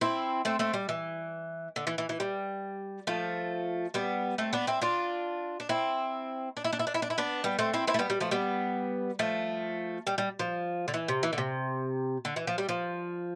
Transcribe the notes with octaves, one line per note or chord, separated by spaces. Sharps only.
C4 E4
A3 C4
A3 C4
G3
E3
D3
E3
E3
E3
G3
F3 A3
G3 B3
A3 C4
B3 D4
C4 E4
D4 F4
D4
C4 E4
D4
E4
D4
E4
D4
E4
D4
E4
B3 D4
G3 B3
A3 C4
C4 E4
C4 E4
A3
G3 B3
G3
F3 A3
G3 B3
F3 A3
G3
G3
F3
D3
E3
C3
E3
D3
C3
D3
E3
F3
G3
F3